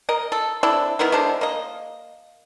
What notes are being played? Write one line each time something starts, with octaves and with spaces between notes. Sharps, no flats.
A#4 D#5
A4
C4 D4 E4 A4
D#3 B3 E4 A#4
G#3 D4 A4 C5
A#3 D#5